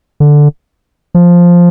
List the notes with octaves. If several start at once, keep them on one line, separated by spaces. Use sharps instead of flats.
D3
F3